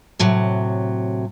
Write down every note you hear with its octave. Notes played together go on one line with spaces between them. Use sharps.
A2 C3 F#3